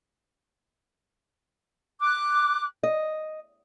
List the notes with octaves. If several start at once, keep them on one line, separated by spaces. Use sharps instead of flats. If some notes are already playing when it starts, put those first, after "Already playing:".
D6 F#6
D#5